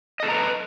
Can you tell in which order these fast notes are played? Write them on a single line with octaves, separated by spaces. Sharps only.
D#5 A4 G#4 A#5 B4